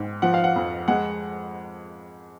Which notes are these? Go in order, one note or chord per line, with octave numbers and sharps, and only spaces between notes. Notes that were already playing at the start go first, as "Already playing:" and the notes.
Already playing: G#2
F3 F#5
F5
F#5
F2
G#3 F#5